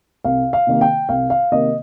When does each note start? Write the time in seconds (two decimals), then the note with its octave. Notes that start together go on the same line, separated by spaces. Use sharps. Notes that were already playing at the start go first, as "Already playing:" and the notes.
0.24 C2 F5
0.53 F5
0.67 C3 D#3 A#3
0.81 G5
1.09 C2 F5
1.30 F5
1.52 C3 D#3 A#3 D#5